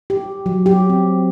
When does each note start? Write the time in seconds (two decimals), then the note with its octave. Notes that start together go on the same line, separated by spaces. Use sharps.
0.10 G4
0.46 F#3
0.66 G4
0.89 C4